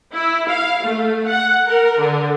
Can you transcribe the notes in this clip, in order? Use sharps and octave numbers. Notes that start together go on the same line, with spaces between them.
E4
F5
A3
F#5
A#4
D3